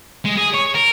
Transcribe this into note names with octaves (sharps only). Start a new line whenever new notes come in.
G#3
G#4
C#5
A#4